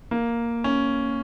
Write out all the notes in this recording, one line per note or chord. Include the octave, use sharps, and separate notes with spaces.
A#3
C#4